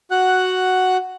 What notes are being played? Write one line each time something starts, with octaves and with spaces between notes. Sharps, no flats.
F#4 F#5 F#6